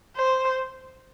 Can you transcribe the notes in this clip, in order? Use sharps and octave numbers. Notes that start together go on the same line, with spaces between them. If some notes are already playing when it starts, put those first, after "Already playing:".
C5